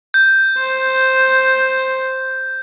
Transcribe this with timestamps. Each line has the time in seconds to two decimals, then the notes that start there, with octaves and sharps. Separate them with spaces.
0.14 G6
0.58 C5